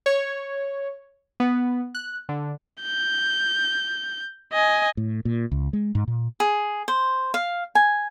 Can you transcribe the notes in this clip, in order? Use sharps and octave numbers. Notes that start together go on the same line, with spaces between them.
C#5
B3
F#6
D3
G6
D#5 G#5
A2
A#2
C#2
G#3
G#2
A#2
G#4
C5
F5
G#5